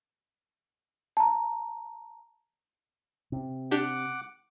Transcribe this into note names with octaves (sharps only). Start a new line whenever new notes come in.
A5 A#5
C3
D4 G4 F#5 D6